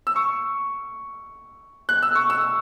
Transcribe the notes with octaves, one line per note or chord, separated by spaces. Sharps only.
E6
C#6
F#6
E6
C#6
E6